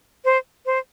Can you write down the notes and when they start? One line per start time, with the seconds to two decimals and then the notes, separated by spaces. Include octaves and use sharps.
0.25 C5
0.66 C5